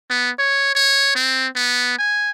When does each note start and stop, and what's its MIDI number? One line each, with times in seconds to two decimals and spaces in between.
0.10 0.31 59
0.39 0.71 73
0.75 1.13 73
1.15 1.48 60
1.55 1.96 59
1.98 2.31 80